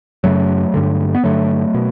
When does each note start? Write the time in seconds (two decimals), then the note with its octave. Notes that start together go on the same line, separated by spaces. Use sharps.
0.24 F#2 C#3 F#3 A3
0.74 G2 D3
1.15 B3
1.24 G2 D3 F#3 A3
1.74 B2